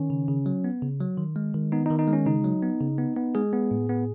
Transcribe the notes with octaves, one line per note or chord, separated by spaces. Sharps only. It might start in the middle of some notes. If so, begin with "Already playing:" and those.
Already playing: D#3 C#4
C#3
C#3
F#3
B3
C#3
F#3
D#3
G#3
D#3
B3 D#4
D#4
D#3
D#4
G#3
C#4
C#3 D#4
F#3
B3
C#3
B3
B3
G#3 G#4
B3
A2
B3